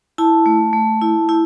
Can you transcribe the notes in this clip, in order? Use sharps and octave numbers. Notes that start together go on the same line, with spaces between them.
E4 A5
A3
A3
E4
E4